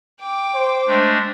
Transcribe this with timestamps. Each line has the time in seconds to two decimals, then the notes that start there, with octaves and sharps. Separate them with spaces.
0.20 G5 D6
0.55 C5
0.87 G#3 A3 D4